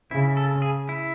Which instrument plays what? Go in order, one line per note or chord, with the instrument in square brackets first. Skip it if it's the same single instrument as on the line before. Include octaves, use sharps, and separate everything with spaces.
[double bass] C#3 [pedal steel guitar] E4
[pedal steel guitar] A4
G#4
E4